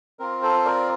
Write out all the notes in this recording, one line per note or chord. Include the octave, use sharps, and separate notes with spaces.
C4 F4 A#4
A4 C5
A#4 D5